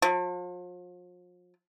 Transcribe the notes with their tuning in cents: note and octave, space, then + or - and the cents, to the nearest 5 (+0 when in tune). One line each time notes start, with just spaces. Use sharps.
F3 +40